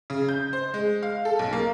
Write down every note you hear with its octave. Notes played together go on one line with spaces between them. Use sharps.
C#3
G6
C5
G#3
F5
A4
B1
A#3